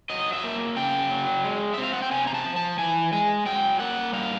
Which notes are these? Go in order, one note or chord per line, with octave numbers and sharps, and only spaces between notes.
F#3 D#5
E5
A#3
C#3 G5
F#3
G#3
C4 E5
F5
F#5
G5
C3 G#5
A#5
A5
F3
A5
E3 G#5
G#3 G#5
F#3 G5
A#3 F#5
G3 F5